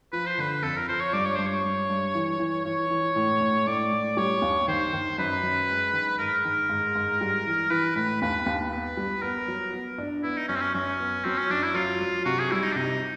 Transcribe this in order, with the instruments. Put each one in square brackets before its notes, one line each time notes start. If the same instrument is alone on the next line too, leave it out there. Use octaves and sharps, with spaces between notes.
[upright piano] F3 [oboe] B4
[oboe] C5
[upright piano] D3 [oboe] B4
[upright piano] F2 [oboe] A4
[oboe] A#4
[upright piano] F3 [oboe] C5
[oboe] C#5
[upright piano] G2 [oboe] D5
[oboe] C#5
[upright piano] G2 [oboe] C5
[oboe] C#5
[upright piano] G2
G2
E3
E3
[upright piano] E3 [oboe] C#5
[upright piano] E3
A2
A2
[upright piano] A2 [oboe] D5
[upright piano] A2
[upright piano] G3 [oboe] C#5
[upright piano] D#2
[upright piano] D#3 [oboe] C5
[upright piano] D#3
[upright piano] F#2 [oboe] B4
[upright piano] F#2
G#3
D#3
[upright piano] G#2 [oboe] A#4
[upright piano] D#3
G#2
G#2
G3
E3
[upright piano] E3 [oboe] B4
[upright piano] A2 [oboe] B4
[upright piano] D#2 [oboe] B4
[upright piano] D#2
[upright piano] B3 [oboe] B4
[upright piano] G3
[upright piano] B3 [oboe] A#4
[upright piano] F#3
B3
D4
[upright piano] B3 [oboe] E4
[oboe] D#4
[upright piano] F#2 [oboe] C#4
[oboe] C4
C#4
[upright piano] F#2 [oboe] C#4
[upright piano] B3
[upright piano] F#3 [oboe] C4
[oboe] C#4
[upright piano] F#2 [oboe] D4
[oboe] E4
[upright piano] F#3 [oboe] F4
[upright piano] F#3
[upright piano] C3 [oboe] F#4
[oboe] G#4
[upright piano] G3 [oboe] E4
[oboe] D#4
D4
[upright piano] C3 [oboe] D#4